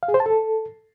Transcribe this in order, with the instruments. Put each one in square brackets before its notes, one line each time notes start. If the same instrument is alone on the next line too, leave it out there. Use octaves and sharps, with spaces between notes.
[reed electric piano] F5
G#4
C5
A5
A4